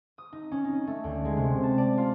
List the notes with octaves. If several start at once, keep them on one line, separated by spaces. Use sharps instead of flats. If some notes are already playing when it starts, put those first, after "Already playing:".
D#6
D#4
C#4
D#4
A3
D2
G#3
C3
A5
D5
F4